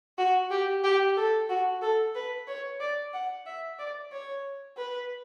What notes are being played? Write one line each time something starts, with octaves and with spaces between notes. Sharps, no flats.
F#4
G4
G4
A4
F#4
A4
B4
C#5
D5
F#5
E5
D5
C#5
B4